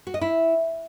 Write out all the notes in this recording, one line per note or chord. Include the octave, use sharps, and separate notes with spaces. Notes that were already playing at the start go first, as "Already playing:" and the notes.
F#4
D#5
E4